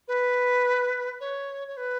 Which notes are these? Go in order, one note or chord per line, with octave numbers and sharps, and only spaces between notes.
B4
C#5
C#5
B4